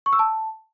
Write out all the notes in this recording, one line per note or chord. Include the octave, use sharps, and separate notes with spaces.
C#6
E6
A5